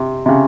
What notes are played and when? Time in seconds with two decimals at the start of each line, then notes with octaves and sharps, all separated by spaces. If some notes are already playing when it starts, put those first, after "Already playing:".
Already playing: C3
0.26 C3
0.29 C#3